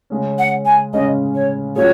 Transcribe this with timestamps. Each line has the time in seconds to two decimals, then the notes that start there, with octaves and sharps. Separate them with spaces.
0.10 C#3 G#3 C#4
0.39 F#5
0.65 G#5
0.93 C#3 G#3 C#4 D#5
1.35 C#5
1.76 A#2 F#3 C#4 G#4 C#5